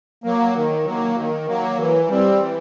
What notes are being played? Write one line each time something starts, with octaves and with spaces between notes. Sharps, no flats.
F#3 A#3
D#3
F#3
A#3
D#3
F#3 A#3
E3
G3 C4
E3